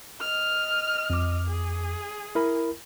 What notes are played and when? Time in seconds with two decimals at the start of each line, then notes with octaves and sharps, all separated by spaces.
0.20 D#5 F6
1.10 F2 D6
1.47 G#4
2.35 E4 A#4 B5